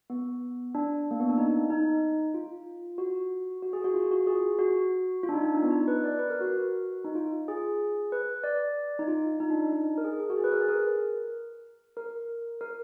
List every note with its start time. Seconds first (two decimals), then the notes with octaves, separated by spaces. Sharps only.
0.10 B3
0.75 D4
1.11 A#3
1.20 B3
1.29 D4
1.38 D#4
1.70 D#4
2.34 F4
2.98 F#4
3.63 F#4
3.73 G#4
3.84 F#4
3.95 F4
4.11 F#4
4.27 G#4
4.59 F#4
5.23 F4
5.29 D4
5.34 D#4
5.45 D4
5.55 D4
5.63 B3
5.71 D#4
5.88 B4
6.04 D5
6.19 B4
6.30 A#4
6.41 F#4
7.05 D#4
7.15 F4
7.48 G#4
8.12 B4
8.44 D5
8.99 D#4
9.08 F4
9.40 D#4
9.50 D4
9.61 D4
9.73 D#4
9.98 A#4
10.04 G#4
10.20 G#4
10.30 F#4
10.37 G#4
10.44 B4
10.52 A#4
10.61 G#4
10.69 A#4
11.97 A#4
12.61 A#4